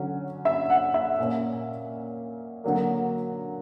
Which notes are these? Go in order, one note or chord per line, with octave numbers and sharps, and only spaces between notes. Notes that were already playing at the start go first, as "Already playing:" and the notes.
Already playing: D3 F#3 C#4
E5
F#5
E5
A#2 A#3 C#4
D3 F#3 A#3